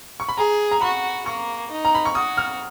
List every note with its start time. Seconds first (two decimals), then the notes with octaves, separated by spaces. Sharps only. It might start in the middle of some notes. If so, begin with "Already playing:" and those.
0.20 C#6
0.29 B5
0.37 G#4 A#5
0.71 A#5
0.81 F#4 B5
1.26 A#3 C#6
1.71 D#4
1.85 A#5
1.95 B5
2.05 C#6
2.15 F#4 D#6
2.37 F6